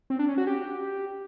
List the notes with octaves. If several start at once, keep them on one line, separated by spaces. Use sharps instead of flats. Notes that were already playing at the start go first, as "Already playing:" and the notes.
C4
D4
C#4
F#4
G4